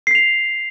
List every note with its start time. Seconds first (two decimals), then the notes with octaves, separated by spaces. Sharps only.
0.07 C7
0.11 B6
0.15 F7